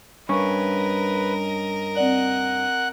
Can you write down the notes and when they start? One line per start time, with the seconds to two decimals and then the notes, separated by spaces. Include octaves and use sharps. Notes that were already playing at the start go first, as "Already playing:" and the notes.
0.29 G2 C#4 A#4 B4 D#5 C#6
1.96 C4 D5 F#5 F#6